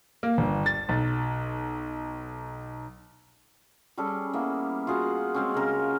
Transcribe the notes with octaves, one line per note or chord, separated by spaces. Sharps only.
A#3
G1
A6
B1
G3 C#4 G#4 A4
A#3 B3 E4
F4 F#4 G#4 F#5
G#3 C4 C#4
C#3 A#4